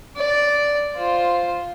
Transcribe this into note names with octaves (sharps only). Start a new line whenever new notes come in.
D5
F4 C5